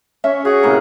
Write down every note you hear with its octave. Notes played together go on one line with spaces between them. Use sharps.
C#4 C#5 E5
F#4 G#4
A2 C3 A#3